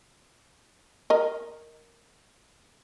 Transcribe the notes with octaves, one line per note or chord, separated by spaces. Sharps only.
A#4 D#5